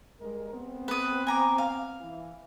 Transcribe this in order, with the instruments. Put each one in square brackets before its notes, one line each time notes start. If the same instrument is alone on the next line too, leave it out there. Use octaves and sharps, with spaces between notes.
[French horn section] G2 G#3 A#4
B3 C4
[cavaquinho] B4 D#6
G#5 A#5 D6
F5
[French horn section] E3